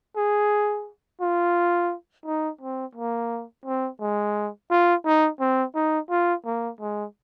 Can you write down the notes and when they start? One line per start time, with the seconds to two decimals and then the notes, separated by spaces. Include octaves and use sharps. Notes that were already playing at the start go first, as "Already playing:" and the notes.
0.16 G#4
1.21 F4
2.26 D#4
2.61 C4
2.95 A#3
3.65 C4
4.00 G#3
4.71 F4
5.05 D#4
5.40 C4
5.75 D#4
6.10 F4
6.46 A#3
6.80 G#3